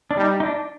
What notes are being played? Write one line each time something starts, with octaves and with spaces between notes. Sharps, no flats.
D4
G3 D#4
D#4
D4